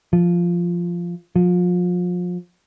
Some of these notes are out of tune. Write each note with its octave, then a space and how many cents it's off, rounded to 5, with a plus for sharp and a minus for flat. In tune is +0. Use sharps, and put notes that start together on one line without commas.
F3 -5
F3 +30